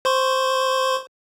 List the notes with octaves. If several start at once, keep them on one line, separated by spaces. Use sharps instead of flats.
C5 C6 C#6